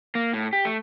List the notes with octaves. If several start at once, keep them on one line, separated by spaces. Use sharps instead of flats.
A#3
A2
G4
A3